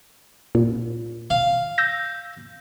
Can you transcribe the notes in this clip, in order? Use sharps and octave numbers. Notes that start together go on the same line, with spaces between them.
A#2
F5
E6 G6 A#6